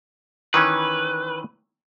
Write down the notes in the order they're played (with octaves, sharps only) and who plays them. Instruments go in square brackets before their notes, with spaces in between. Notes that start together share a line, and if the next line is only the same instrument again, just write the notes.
[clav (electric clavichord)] D#3 E3 C#4 [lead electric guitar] B4